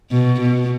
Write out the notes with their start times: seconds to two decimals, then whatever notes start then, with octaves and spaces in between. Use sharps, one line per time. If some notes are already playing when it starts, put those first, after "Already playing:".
0.11 B2
0.41 B2